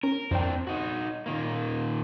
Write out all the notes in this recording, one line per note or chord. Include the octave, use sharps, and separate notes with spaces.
C#4 A#4
F2 C4 D4 G5
D#4 F#4
A#2 D#3 A#3